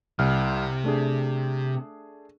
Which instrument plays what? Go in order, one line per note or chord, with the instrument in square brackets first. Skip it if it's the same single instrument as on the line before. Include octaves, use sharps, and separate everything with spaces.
[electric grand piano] C2 F6 [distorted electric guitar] C3
[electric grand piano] A3 D4 G#4